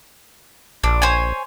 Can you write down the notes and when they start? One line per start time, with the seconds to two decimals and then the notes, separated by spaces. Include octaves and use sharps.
0.84 A#1 D4
1.02 C5 C#5 G#5